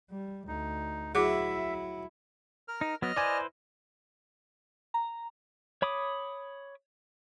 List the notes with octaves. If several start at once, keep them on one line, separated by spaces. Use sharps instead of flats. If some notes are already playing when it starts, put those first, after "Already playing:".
G3
D2 D#4
F#3 E4 G#4 E5 D6
A#4 F6
D#4
F#3 B3 D#5 F6
E4 B4 C5 D5 G#5
A#5
C#5 B5 D6 D#6